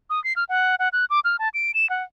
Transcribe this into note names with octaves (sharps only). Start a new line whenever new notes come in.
D#6
C7
F6
F#5
F#5
F#6
D6
F6
A5
D7
E7
F#5